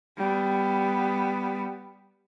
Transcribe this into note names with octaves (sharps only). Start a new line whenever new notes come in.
G3 B3